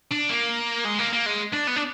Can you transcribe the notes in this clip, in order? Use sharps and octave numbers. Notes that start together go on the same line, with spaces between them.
D4
A#3
G#3
A#3
A#3
G#3
D4
B3
D4